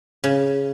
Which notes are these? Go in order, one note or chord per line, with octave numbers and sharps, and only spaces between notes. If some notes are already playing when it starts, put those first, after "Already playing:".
C#3